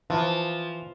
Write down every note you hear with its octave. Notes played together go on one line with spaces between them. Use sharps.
E3 F3